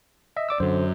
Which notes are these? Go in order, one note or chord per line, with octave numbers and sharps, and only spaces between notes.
D#5 E5
D5 D6 E6
F#2 D3 C5